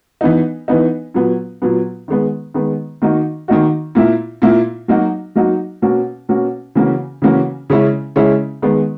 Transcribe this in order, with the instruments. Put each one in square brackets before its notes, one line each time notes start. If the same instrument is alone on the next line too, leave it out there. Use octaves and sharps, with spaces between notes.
[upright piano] E3 B3 D#4
E3 B3 D#4
A#2 F#3 B3
A#2 F#3 B3
D#3 G#3 B3
D#3 G#3 B3
D#3 A#3 D#4 F#4
D#3 A#3 D#4 F#4
A#2 A#3 E4
A#2 A#3 E4
F#3 A#3 D#4 F#4
F#3 A#3 D#4 F#4
B2 A#3 C#4 F#4
B2 A#3 C#4 F#4
C#3 E3 A#3 C#4 F#4
C#3 E3 A#3 C#4 F#4
C#3 G#3 C#4 E4
C#3 G#3 C#4 E4
D#3 G#3 B3